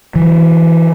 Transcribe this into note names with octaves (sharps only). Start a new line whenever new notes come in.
E3 F#3